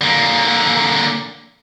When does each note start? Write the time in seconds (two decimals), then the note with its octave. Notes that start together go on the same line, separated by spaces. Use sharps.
0.01 D3 A#3